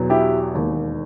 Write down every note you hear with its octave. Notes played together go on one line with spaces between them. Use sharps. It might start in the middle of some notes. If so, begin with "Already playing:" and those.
Already playing: E2 B2 F#3
E4 G4
E1 D#2 D#3